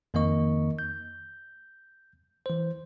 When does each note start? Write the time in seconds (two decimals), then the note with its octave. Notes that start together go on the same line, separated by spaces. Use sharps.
0.14 F2 D#3 A#3 A#4 D#5 C#6
0.79 G6
2.46 E3 C5